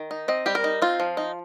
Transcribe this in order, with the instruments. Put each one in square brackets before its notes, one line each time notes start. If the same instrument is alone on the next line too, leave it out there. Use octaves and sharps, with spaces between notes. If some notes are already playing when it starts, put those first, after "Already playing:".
Already playing: [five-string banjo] D#3
D#4
C4 D#5
G3 G4
A#4
D#4
C4 F4
F3
D#4